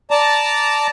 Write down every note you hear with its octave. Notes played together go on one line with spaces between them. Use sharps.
D5 A5 A#5